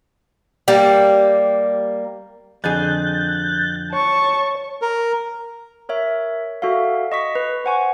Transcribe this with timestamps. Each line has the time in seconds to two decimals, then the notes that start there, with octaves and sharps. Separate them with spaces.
0.68 G3 A#3
2.64 F2 D3 G#4 F#6 G6 A6
3.92 C#5 A5 C#6
4.82 A#4
5.89 A#4 C#5 E5
6.62 F#4 A4 E5 F5
7.12 D#5 C#6 B6
7.35 B4
7.64 C5 F#5 G#5 C#6